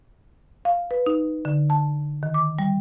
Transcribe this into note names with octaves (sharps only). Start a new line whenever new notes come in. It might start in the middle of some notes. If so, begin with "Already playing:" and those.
F5
B4
D#4
D3
A5
D#3
D6
G3